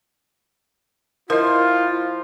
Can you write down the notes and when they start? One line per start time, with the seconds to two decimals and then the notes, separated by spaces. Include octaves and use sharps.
1.30 F3 E4 F4 A#4 D#5